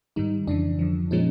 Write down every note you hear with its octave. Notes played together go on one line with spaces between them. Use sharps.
G#2 D#3 G3 D#4
F2 C#3 E3 D4
F2 D3 F3
A#2 F3 G#3 C#4 D#4